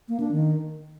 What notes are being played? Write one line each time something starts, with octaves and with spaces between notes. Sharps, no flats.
A#3
D4
D#3